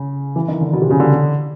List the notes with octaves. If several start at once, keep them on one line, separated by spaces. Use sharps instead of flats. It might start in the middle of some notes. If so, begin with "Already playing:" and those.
Already playing: C#3
E3
D#3
D3
B2
C3
C#3
D3